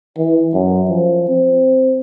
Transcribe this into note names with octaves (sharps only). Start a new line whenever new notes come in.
E3
F#2
F3
C4